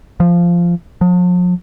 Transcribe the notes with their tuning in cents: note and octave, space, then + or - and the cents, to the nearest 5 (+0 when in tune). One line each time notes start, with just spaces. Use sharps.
F3 -10
F3 +45